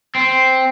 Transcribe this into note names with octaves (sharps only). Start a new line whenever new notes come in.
C4